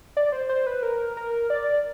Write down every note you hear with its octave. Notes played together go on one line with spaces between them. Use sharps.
D5
C5
C5
B4
A#4
A#4
D5